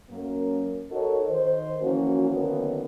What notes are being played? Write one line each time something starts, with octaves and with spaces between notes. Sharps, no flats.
F#2 A#3
D#4 F#4 A4 A#4 C#5 D#5
D#3 C5
E3 F3 A#3 C#4 F#4
F#2 D3 D#3 F#3 A#3 B3